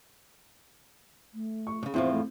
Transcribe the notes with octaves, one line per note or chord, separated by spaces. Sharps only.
A3
C#6
A#2 C#3
E2 A2 F3 C4 E4 C5
A3